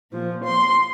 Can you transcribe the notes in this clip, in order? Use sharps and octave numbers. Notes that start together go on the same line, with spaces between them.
A#2 F3
C6